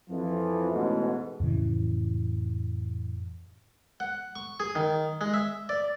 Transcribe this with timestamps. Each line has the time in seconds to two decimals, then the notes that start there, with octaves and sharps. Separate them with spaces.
0.10 F2 E3 F3
0.72 A1 G#2 B2
1.40 F2 A2 C#3 E3
4.00 F#5
4.36 C#6
4.60 G#4
4.75 D#3
5.21 G#3
5.34 E5
5.69 D5